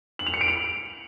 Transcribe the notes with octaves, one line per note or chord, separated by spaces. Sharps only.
F#7
F7
C#7
D7
F7